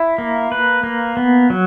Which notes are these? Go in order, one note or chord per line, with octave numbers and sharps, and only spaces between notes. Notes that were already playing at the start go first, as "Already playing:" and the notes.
Already playing: E4
A#3
B4
A#3
B3
F#3